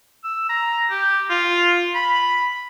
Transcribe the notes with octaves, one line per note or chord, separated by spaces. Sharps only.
E6
A#5
G4
F4
B5